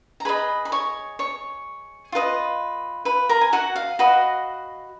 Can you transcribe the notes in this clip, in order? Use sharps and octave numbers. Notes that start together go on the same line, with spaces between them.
A#5
G#4 B4 D#5 B5
B5
C#5 C#6
C#5 C#6
F4 B4 D#5
B4 B5
A#4 A#5
G#5
F#4 F#5
F5
F#4 B4 D#5